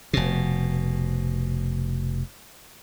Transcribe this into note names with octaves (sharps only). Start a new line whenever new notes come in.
F1 B2